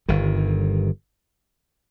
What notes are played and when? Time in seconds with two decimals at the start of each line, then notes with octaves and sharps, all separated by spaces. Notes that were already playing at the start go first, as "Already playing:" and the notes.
0.08 G1 G2 D#3